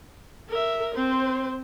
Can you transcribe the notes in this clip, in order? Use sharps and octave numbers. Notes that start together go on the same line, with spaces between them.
A#4 E5
C4 C5